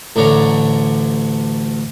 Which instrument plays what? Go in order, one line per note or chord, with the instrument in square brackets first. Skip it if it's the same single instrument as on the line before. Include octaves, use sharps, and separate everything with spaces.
[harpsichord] A1 D2 D4 C#5 A#5